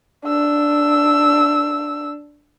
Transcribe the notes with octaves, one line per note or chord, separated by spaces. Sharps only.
D4 E6